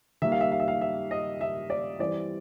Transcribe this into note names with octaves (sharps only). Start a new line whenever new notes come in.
D#3 G3 A#3 E5
F5
E5
F5
E5
F5
E5
D#5
E5
D5
E3 G3 C4 D5